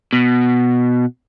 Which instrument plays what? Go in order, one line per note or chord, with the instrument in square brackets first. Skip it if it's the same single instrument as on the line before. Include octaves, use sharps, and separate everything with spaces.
[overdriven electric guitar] B2